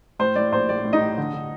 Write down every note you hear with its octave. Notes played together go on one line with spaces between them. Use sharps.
A2 C5
A2 D5
A#1 C5
A#1 D5
A2
D#4 D#5
A2
D3
D3